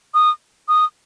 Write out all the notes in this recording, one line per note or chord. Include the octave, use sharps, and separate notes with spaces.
D#6
D#6